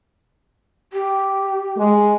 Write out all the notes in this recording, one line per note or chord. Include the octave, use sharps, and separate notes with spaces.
G4
G#3